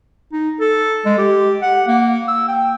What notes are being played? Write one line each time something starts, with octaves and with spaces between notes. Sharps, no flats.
D#4
A4
G#3
G4
F#5
A#3
E6
G5